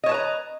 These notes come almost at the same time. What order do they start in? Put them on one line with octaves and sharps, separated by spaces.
D#5 C#5 A5 B4 A#5